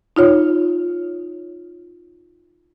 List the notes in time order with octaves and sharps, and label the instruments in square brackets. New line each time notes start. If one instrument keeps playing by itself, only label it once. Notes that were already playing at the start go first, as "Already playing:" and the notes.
[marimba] D#4 F4 C#5